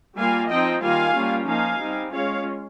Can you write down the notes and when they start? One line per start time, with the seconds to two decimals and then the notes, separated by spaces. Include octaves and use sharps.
0.16 G3 A#3 F4 F5 G#5
0.49 F3 C4 D#4 D#5 G5
0.82 D#3 G3 A#3 F4 F5 G#5
1.15 G3 A#3 C#4 F4
1.47 F3 A#3 D#4 F5 G#5
1.80 G3 C4 D#4
2.12 G#3 C#4 F4 C#5 F5